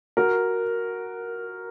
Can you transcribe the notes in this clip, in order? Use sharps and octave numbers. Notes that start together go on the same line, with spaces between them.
F#4 A#4